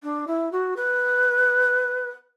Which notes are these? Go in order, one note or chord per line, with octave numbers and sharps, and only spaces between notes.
D4
E4
F#4
B4